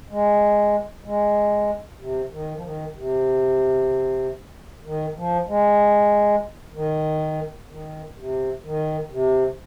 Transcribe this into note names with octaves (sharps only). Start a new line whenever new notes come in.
G#3
G#3
C3
D#3
F3
D#3
C3
D#3
F3
G#3
D#3
D#3
C3
D#3
C3